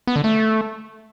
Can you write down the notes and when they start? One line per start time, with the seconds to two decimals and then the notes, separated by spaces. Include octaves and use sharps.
0.07 B3
0.16 D3
0.24 A3